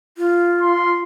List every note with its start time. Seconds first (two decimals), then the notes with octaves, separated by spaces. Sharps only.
0.18 F4
0.61 C6